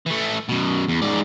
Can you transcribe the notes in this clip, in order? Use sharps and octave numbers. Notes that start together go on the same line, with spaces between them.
E3 A3
F#2 B2
E2
G#2 D5